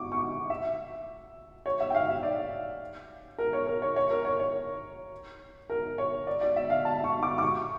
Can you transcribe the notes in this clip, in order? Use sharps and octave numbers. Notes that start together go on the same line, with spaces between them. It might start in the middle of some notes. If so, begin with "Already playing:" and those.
Already playing: C#6 D6
C#6
E5
C#5
E5
G5
F5
E5
D5
A#4
C#5
A#4
C#5
C#5
A#4
C#5
C#5
A#4
C#5
D5
D5
E5
F5
A5
C#6
D6
D6
C#6